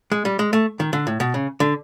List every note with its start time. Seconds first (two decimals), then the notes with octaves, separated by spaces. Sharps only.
0.12 G#3
0.25 G3
0.39 G#3
0.53 A3
0.80 D#3
0.93 D3
1.07 A2
1.20 B2
1.34 C#3
1.60 D3